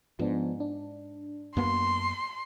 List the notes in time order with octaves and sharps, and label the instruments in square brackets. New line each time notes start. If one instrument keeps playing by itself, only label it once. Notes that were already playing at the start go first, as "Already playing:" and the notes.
[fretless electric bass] G#2 [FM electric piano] F3 B3 D4
[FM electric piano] D4
[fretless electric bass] F#2 A#3 B3 [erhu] C6